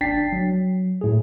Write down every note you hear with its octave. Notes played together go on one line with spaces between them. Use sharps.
G1 D4 G5 A6 B6 C7
F#3
A2 G#4